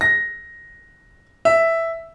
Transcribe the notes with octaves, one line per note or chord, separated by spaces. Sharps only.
A#6
E5